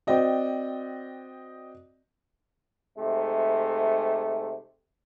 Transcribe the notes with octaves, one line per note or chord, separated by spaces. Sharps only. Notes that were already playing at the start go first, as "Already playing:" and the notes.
C4 F#4 D5 D#5 G5
G#2 C3 A3